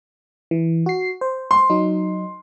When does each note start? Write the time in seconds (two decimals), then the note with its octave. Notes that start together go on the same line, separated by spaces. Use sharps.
0.51 E3
0.86 F#4 C7
1.21 C5
1.51 C6
1.70 F#3 D#4